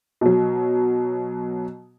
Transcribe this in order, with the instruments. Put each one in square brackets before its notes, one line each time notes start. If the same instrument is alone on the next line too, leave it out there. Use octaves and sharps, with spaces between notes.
[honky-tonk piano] B2 F#3